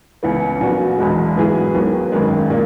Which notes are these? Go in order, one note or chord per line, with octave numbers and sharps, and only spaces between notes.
C#2 C#3 E3 B3
A#1 A#2 F#3 B3 F#4
E1 E2 B2 G#3
G#2 F#3 B3 E4 G#4
D#2 D#3 F#3 B3
G#1 F#2 D#3 G#3
A#2 A#3